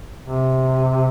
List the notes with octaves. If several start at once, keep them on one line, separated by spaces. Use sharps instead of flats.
C3